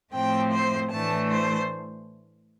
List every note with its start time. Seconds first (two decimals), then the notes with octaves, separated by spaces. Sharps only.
0.13 A2 F3 A3 C4 G5
0.52 C5
0.91 A2 E3 A3 D4 A5
1.30 C5